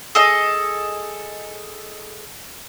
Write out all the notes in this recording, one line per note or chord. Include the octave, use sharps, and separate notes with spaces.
G#4 A4 D#5